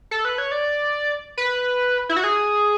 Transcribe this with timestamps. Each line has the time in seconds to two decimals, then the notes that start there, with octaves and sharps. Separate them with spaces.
0.11 A4
0.25 B4
0.38 C#5
0.52 D5
1.37 B4
2.09 E4
2.17 F#4
2.24 G#4